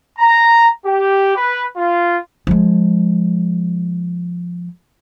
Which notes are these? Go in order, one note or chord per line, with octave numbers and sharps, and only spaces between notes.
A#5
G4
B4
F4
F3 G#3